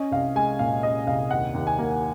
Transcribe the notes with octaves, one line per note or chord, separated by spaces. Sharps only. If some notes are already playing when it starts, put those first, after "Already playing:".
Already playing: C#4 D#5
C2 F5
G#3 G#5
A#2 F5
C#4 D#5
C2 F5
D#2 F#5
D#2
G#5
A#3